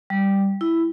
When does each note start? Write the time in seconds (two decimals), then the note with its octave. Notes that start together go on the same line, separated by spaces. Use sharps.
0.10 G3
0.61 E4